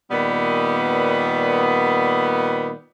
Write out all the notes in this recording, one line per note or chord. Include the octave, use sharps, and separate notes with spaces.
A#2 D#3 G3 B3